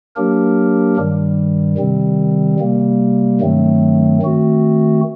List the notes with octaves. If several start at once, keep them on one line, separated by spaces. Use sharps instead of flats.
F#3 A#3 D4 G4 A#4
G2 D#3 G3
C3 D#3 G3 C4
C3 G3 A#3
G2 D#3 F#3 A3 C4
D#3 A3 C4 F#4